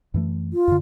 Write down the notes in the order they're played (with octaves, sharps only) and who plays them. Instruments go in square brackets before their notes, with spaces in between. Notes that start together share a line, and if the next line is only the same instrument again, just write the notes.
[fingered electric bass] F#2 E3 A3
[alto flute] F4
[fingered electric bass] F#2 D3